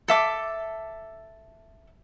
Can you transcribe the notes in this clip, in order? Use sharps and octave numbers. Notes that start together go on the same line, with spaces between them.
A4 E5 D6